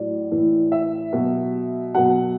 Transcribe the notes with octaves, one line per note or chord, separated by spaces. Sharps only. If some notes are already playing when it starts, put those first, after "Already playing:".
Already playing: A2 F#3 D5
A2 E3
E5
B2 F#3
B2 F#3 F#5